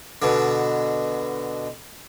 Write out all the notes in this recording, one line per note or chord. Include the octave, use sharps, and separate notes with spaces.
B2 D3